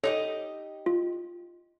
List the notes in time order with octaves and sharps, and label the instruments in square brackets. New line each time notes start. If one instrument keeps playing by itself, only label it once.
[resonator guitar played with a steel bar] D#4 G4 D#5 [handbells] A4 C#5
[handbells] F4